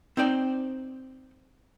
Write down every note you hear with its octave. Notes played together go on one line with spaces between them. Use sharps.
C4 D#4 C5 D5 G5